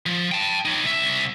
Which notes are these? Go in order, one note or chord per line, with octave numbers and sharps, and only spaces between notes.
F3
G5 A5
D#4 C#5
C2 E5